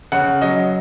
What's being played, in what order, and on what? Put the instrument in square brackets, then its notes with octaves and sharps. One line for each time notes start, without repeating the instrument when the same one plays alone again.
[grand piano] C#3 F#5
F#3 D#5